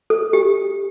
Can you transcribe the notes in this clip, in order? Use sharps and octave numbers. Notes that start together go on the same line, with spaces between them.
A4
G4